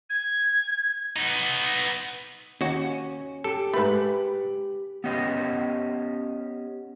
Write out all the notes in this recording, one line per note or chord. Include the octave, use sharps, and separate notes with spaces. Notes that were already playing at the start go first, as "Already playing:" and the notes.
G#6
B3 D#4
D#2 C#4 F#4
G4 A4
G#2 A3 B4 B5
B3 C#4 G4 D#5